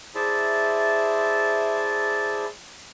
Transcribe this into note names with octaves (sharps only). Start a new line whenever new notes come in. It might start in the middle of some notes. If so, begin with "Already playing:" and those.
E4 G#4 C5 D5 E5 A5